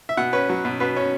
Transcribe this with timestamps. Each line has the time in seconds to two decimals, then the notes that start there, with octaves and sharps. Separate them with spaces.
0.09 E5
0.17 B2 F#5
0.33 C#4 B4
0.49 F#3
0.65 B2
0.80 B2 B4
0.96 C#4